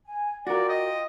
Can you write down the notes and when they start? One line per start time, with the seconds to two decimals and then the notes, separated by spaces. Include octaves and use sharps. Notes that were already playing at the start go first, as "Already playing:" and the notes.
0.05 G#5
0.47 F4 F#4 A#4 D5 G5
0.69 D#5